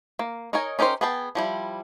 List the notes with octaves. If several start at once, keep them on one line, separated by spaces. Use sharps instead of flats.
A#3
D#4 A#4 C#5 D#5 G#5
C#4 D#4 G4 A#4 C5
B3 G#4 G5 A5
F3 G3 E4